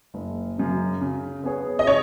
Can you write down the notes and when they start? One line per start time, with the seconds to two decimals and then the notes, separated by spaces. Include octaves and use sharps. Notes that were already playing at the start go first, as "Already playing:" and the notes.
0.14 F#1
0.58 F#2 C#3
1.01 C#3
1.44 B3 G#4 C#5
1.79 D#5
1.87 C#3 C#5